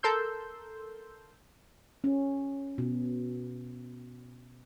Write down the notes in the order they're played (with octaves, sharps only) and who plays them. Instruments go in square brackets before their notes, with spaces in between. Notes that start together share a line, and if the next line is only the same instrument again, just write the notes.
[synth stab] A4 A#4 C6 E6 G6
[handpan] C#4
B2